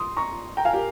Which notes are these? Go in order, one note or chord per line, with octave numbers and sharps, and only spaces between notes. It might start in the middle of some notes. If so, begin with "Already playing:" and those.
Already playing: C6 D#6
A#5 C#6
G5 A#5
F5 G#5
G4 A#4